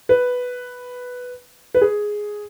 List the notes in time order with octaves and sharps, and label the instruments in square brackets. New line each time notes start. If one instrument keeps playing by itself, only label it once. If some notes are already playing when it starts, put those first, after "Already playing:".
[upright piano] B4
B4
G#4